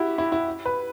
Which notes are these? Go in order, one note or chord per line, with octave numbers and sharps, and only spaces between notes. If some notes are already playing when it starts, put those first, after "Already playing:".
Already playing: E4 F#4 G4
E4
E4
B4